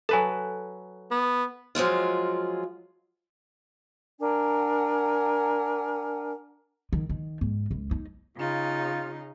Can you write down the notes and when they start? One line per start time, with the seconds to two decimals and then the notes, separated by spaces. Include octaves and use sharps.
0.09 F#3 A4 B4 G#5 A5
1.11 B3
1.75 F3 F#3 G#3 F4
4.20 D4 A#4 F#5 G#5
6.93 D#3
7.09 D#3
7.41 G#2
7.71 C#2
7.91 D#4
8.37 C#3 D#4 F4